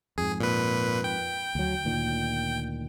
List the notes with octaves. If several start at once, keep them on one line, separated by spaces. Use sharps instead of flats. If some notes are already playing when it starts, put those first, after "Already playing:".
F2 G#2 G#4
A#2 B4
G5
D2 F#3
D2 A#2 D#3